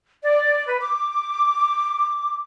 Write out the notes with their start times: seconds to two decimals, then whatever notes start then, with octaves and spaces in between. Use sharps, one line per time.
0.23 D5
0.68 B4
0.81 D6